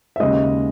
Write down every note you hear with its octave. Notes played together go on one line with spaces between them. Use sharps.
E5
D#2 C#3 G#3 D#5